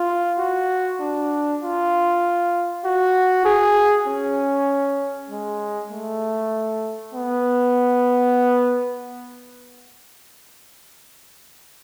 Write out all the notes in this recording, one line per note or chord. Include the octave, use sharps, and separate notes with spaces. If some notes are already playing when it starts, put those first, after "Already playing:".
Already playing: F4
F#4
D4
F4
F#4
G#4
C#4
G#3
A3
B3